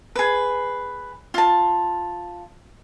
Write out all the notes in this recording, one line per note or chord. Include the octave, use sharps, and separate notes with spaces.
G#4 B4
F4 A5